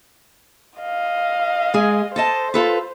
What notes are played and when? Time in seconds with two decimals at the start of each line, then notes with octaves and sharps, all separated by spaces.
0.80 D#5 F5
1.74 G#3 G#4
2.16 A4 C5 D#5 A5
2.54 F4 A4 B4